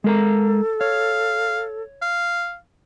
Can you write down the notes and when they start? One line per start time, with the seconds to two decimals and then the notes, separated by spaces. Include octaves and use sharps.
0.04 G#3 A4 A#4 A#5
0.81 C#5 F5
2.02 F5